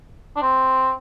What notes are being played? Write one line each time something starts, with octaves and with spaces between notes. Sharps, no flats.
D4
C4